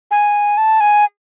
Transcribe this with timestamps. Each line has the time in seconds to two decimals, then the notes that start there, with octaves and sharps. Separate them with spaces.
0.11 G#5
0.58 A5
0.80 G#5